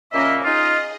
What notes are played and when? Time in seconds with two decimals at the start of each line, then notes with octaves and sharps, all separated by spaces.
0.13 A#2 C#3 A#3 C#4 D#5 E5
0.45 D#4 F4 G#4 D#5